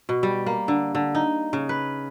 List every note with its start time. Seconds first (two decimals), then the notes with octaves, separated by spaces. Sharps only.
0.09 B2
0.23 G3
0.46 A#3
0.68 D3
0.95 D3
1.15 D#4
1.53 C#3
1.69 B4